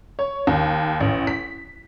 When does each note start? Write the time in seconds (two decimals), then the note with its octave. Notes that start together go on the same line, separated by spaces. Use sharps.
0.19 C#5
0.47 D#2
1.00 A1
1.27 B6